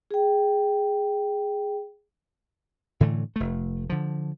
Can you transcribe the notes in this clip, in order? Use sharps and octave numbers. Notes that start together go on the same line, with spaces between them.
G#4 G5
A2 D3 E3 A3
F1 A3
D3 F3